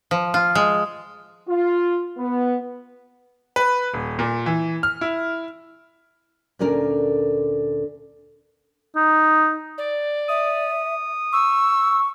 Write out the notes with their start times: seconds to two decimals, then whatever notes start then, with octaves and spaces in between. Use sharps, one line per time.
0.11 F3
0.34 F4
0.55 G#3
1.48 F4
2.17 B3
3.56 B4
3.94 D#1
4.19 A#2
4.46 E3
4.83 F6
5.01 E4
6.59 D2 A#2 D3 C#4 A#4 D5
8.96 D#4
9.77 D5
10.29 E5 D#6
11.32 C#6 E6